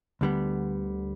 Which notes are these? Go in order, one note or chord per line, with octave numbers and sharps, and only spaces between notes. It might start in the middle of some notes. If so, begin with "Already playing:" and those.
D2 D3 G3 B3